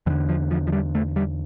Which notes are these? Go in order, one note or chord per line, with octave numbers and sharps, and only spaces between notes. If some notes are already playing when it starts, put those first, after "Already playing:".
E2 D3 E3
F3
F3
F3
G3
A3
G3